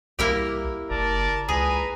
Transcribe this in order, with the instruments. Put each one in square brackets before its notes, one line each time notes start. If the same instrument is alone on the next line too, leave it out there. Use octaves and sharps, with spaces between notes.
[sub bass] C2 [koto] A#3 E4 G4
[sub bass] F#1 [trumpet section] A#4 D5 A5
[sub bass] C#2 [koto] G#4 [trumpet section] B4 G#5 A#5